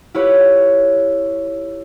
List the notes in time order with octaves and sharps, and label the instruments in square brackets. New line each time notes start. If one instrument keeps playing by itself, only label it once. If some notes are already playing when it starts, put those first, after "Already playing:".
[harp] E4 F4 G4 B4 C#5